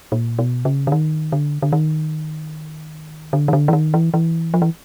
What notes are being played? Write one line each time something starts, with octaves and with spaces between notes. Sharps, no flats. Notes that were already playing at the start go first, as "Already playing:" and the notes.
A#2
B2
C#3
D3
D#3
D3
D3
D#3
D3
D#3
D3
E3
D#3
E3
E3
F3
E3